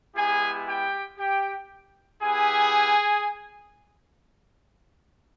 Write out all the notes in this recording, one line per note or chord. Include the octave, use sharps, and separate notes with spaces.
G#3 B3 E4 G4 G#4 G#5
G4 G5
G4 G5
B3 E4 G4 G#4 G#5